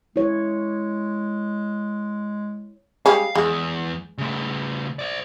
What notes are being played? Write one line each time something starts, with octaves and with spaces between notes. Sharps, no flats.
G#3 E4 C#5
G3 G#3 C#4 F5
E2 G#3
C#3 A3
C5 D5